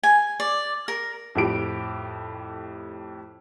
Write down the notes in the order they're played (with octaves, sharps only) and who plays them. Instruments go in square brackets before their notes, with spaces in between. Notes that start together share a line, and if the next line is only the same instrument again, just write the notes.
[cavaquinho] G#5
D5
A#4
[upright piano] F2 A2 G4 D7